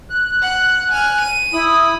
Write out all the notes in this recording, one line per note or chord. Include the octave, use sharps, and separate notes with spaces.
F#6
F#5
G#5 F6
D#7
E4 B5 D#6